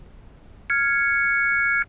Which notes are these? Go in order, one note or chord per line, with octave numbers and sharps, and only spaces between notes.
F6 G#6 C#7